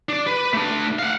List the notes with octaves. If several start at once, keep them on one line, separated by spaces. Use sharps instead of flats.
D4 D5
B4
A3 D4
F5 F#5